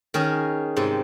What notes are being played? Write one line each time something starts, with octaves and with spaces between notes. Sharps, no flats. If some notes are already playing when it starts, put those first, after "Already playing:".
D#3 C#4 G#4 D#5
G#2 C3 G3